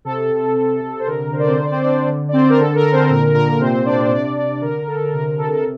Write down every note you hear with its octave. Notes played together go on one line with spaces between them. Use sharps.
C3 A4
C3
C3
C3
C5
D3 A#4
D3 C5
D5
C4 C5
D3 C5
D5
C4 C5
D3 D4 D5
D3
D5
D3 C4 C5
A#4
D3 A4
A#4
D3
C4 C5
A#2 A#4
A#2 A#4
A#4
C3 C4 C5
C3 D4 D5
C5
C3 D4 D5
C3
D3 A#4
D3 A4
C3 A#4
C3 A4
A4